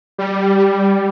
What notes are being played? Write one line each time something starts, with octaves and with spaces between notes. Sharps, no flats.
G3